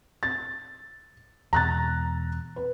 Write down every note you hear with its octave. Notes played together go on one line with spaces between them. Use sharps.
A6
E2 B2 A#5 F#6 A6
B4